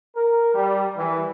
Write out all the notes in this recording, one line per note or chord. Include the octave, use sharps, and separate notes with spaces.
A#4
G3
E3